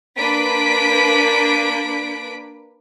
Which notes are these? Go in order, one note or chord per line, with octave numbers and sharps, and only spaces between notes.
A#3 D4 B4 B6 D7